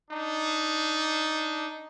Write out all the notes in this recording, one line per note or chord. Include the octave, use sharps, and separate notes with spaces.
D4 D#4